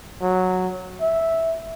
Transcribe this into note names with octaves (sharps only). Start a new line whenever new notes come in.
F#3
E5